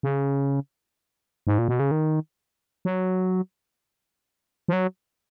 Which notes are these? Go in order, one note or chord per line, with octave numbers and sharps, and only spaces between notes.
C#3
G#2
A#2
B2
C#3
D#3
F#3
F3
F#3